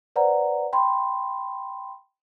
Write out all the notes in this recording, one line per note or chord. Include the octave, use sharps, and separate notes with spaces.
B4 C5 D5 F#5 A#5
G5 B5 C6